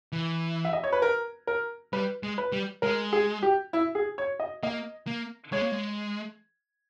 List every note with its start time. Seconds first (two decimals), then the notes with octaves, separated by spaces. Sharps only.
0.12 E3
0.65 E5
0.73 D#5
0.84 C#5
0.92 B4
1.02 A#4
1.47 A#4
1.93 G3 B4
2.23 G#3
2.38 B4
2.52 G3
2.82 G#3 A#4
3.13 G#4
3.43 G4
3.73 E4
3.95 G#4
4.18 C#5
4.40 D#5
4.63 A#3 D#5
5.07 A#3
5.52 G#3 C#5
5.61 A#3
5.72 G#3